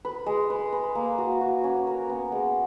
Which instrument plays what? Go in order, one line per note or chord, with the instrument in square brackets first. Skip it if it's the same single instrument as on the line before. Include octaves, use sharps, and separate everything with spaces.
[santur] B4
G#3
B4
B4
A#3
F#4
F#4
C#4
A#4
B3
G#3